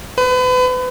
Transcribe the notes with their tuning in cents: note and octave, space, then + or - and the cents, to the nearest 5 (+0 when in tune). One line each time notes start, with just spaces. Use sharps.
B4 +35